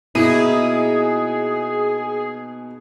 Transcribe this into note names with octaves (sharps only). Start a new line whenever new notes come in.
B2 A#3 D#4 E4 G#4